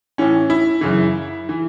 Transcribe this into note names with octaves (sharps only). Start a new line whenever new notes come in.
A2 E3 C#4
E4
F#2 C#3 E3
E3